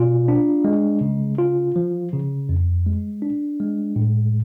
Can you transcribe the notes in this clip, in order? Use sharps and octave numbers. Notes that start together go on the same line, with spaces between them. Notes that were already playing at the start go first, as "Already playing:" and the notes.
Already playing: B2 F4
D4
G#3
C#3
F4
F3
C#3
F2
G#3
D4
G#3
A2